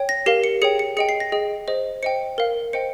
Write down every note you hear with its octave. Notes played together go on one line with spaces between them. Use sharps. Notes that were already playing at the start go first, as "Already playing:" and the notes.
Already playing: C#5 G5
A#6
G4 A#4 F5 C7
C#7
G#4 C#5 G5 C#7
C#7
G#4 D#5 G5 C#7
C7
A#6
G#4 D#5 G5
G#4 C5 D#5
C5 D#5 G5 C#7
A#4 F5
C5 D#5 G5 C#7